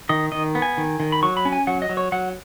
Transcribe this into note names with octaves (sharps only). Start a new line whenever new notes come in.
D#3 D#5
D#3 D#5
B3
G#5
D#3
D#3
B5
F#3 C#6
B5
C#4
G#5
F#3 F#5
D#5
F#3
C#5
F#3 F#5